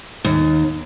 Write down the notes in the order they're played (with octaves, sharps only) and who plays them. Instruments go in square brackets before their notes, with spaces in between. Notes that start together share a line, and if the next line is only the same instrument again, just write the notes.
[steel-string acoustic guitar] D#2